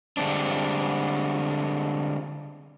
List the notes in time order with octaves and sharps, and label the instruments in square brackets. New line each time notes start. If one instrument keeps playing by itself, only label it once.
[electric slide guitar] D3 G3 G#3 C4 D4